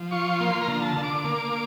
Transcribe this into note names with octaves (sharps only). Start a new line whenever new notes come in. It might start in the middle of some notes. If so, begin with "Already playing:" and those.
Already playing: F3
F4 C#6
A#3 C6
A#5
D3
A5
D3
D6
A#3 D6